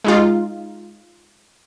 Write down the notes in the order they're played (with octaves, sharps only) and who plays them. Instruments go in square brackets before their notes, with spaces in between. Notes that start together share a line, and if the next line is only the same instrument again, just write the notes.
[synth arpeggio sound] G#3 D#4 F4